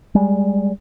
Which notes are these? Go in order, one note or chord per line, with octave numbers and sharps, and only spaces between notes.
G3 G#3